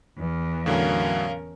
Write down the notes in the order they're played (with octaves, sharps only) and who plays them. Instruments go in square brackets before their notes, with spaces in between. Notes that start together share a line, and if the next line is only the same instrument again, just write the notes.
[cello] E2
[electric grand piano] A2 D3 F#3 [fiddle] C#4 A#4 [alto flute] F5